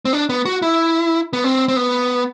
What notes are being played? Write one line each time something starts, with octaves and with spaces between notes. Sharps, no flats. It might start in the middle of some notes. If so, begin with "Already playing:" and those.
C4
D4
B3
F#4
E4
B3
C4
C4
B3